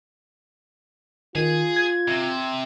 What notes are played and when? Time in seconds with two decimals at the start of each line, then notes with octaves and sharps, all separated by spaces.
1.35 D#3 F4 G#4
1.76 G#6
2.08 C3